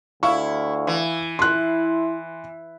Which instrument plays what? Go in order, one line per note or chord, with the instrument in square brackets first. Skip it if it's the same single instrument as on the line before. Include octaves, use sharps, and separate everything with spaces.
[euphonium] D2 [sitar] E4 [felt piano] F5 C#6
[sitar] E3
[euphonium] E4 [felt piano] C6 F#6